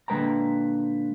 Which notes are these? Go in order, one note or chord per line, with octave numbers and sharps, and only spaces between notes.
A#2 D3 G#3 B4 G5 A#5